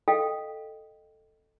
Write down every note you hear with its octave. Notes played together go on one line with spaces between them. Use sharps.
A4 D#5 F5 G5